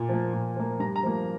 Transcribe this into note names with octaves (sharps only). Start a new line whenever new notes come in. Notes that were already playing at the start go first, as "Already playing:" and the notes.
Already playing: A#2
F3 A#3
A#2
F3 A#3
G2 A#5
A#5
F3 A#3